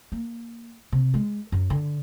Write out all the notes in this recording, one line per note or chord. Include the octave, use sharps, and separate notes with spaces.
A#3
C3
G#3
F#2
D3